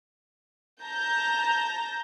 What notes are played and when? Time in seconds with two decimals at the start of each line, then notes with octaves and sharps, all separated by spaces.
0.84 A5 A#5 G6 A#6